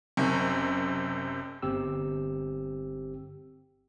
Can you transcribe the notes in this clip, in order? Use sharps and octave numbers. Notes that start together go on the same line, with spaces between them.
F#1 F#2 C3
G1 C4 G4 E6